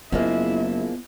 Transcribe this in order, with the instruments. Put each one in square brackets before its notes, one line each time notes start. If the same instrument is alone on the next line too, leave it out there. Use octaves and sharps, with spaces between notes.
[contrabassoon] F#1 [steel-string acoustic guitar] F3 G#3 A#3 [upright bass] B3 [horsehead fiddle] E4 E5